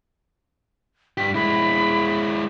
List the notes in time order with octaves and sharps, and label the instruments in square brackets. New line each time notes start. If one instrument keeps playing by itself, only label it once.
[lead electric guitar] G2 G4 [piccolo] B6
[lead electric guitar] G#3 E4 [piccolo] B5